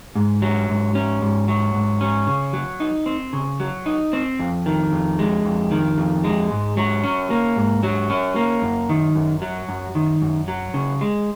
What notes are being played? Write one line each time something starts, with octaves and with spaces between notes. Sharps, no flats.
G#2
F#3
G#2
C#4
G#2
F#3
G#2
C#4
C#3
F#3
D#4
C4
C#3
F#3
D#4
C4
F2
D#3
F2
G#3
F2
D#3
F2
G#3
G#2
F#3
C#4
A#3
G#2
F#3
C#4
A#3
F#2
D#3
F#2
F#3
F#2
D#3
F#2
F#3
C#3
G#3